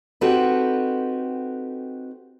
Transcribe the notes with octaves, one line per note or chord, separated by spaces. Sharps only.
C4 D#4 F#4 G4 A4 B4